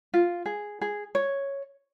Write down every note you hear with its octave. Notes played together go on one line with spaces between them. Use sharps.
F4
G#4
G#4
C#5